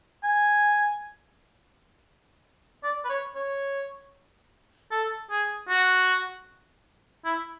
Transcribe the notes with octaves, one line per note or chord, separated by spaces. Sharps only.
G#5
D5
B4
C#5
C#5
A4
G#4
F#4
E4